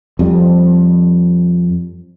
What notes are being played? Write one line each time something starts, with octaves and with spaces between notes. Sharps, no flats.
F2 G3